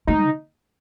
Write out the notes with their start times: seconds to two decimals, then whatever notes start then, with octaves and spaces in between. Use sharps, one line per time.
0.07 A3 D#4
0.25 C3